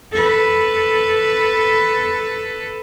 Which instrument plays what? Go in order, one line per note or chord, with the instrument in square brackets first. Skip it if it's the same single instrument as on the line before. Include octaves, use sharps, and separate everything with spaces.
[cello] A4 B4